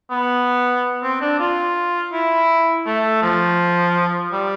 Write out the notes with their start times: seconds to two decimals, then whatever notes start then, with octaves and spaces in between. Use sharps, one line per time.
0.11 B3
1.03 C4
1.21 D4
1.40 F4
2.13 E4
2.86 A3
3.22 F3
4.33 G3